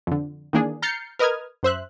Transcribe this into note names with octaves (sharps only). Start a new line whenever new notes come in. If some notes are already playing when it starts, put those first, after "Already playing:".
F2 D3
D#3 E3 A#3 D4 G#4
A#5 F6 G6 A6 C7 C#7
A#4 B4 D#5 D#6 F6 G#6
F#2 C5 E5 F#6